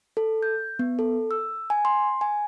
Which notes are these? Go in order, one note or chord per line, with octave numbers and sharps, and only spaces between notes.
A4
G6
B3
A4
E6
G#5
C6
G#5